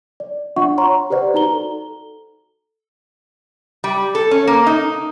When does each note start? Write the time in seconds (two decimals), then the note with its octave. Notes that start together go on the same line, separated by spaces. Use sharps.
0.20 D5
0.56 D4 F4 E5 F#5 C#6
0.78 C#5 F#5 A#5 C6 C#6
1.10 G4 B4 C5 D5 F#5
1.34 D#4 F#4 A#5 G7
1.53 A4
3.84 G3
4.15 A4
4.31 C#4
4.47 A#3
4.67 D#4